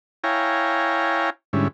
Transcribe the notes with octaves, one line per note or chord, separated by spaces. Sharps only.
E4 C#5 F5 G5 G#5 A#5
G#2 D3 G3 C#4 E4